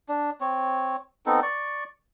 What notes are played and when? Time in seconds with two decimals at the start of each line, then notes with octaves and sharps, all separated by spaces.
0.09 D4
0.41 C4 C#5
1.26 B3 C4 D#4 A4
1.43 D5 C#6